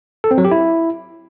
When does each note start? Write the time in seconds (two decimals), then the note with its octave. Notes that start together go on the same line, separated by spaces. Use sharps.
0.24 A4
0.31 C4
0.38 F#3
0.45 G4
0.51 E4